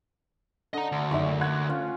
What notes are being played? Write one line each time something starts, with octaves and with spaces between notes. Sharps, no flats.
D3 D#5 A#5
D2
F#1 D#3 E5 C#6
F#5 F#6 G#6
C#4 F4 C#5